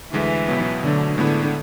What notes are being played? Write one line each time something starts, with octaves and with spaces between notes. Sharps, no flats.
D2 D3 E3 G#3
C#2 B2 F#3 B3
B2 D3 F#3 A3
A2 D3 G#3 B3 E4